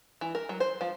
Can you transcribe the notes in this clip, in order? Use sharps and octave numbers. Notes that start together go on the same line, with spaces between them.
E3
A#4
F#3
C5
F3